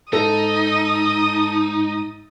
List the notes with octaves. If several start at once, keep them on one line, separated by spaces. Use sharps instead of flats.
G#2 D#4 A4 D#6